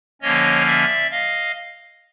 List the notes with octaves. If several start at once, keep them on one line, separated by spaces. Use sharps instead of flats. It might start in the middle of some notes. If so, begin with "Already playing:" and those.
D3 F3 A#3 C#4 C#5 D#5
D5 E5
D#5 F5